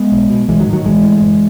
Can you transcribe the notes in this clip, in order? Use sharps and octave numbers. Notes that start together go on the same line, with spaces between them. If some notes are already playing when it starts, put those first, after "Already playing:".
Already playing: G#3 B3
B1
B2
B1 E3 G#3
D#3 F#3
A2
D#3 F#3
B1 E3 G#3
A2
F#1